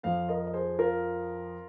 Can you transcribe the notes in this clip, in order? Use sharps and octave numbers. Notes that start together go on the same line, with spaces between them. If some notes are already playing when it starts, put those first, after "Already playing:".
F2 F3 C5 F5
A#4 D#5
D#5
G#4 C5
F4 A#4